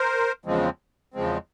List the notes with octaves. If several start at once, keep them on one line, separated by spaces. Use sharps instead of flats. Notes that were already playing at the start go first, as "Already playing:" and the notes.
Already playing: A#4 C5
E2 C#3 F3 G#3 C4
E2 C#3 F3 G#3 C4